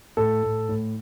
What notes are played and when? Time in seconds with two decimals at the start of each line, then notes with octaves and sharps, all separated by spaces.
0.17 A2 A4
0.43 A2
0.69 A2